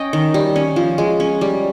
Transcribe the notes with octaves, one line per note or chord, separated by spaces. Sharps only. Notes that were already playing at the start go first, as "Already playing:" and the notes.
Already playing: C#4 D#5 G5
D#3
G3
C#4
F3
G#3
C#4
G3